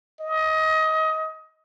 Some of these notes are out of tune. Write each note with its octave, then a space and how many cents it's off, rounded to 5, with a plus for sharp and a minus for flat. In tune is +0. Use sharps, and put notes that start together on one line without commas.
D#5 +25